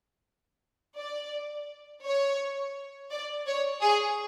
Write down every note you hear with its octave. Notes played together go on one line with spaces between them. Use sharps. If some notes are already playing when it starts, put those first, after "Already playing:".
D5
C#5
D5
C#5
G#4